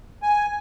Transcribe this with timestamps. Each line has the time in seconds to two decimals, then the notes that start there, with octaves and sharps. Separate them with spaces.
0.23 G#5